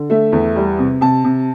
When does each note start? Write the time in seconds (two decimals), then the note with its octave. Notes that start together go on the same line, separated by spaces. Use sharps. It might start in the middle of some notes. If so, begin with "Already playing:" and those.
Already playing: D3
0.10 A3 E5
0.33 E2
0.56 G3
0.79 C3
1.01 C3 A5
1.24 C3